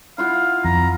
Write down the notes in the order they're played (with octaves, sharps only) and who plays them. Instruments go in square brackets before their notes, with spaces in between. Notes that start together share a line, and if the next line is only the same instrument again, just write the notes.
[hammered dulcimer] E4 F4 F#5 [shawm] F5
[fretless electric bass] F2 [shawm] A#5